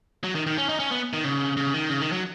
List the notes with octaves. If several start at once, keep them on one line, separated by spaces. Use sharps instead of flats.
F#3
D#3
D#3
C#4
D#4
C#4
B3
D#3
C#3
C#3
D#3
C#3
D#3
F#3